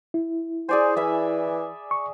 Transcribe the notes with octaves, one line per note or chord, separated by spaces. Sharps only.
E4
G#4 C5 D5 G#5
E3 E5 B5
C#6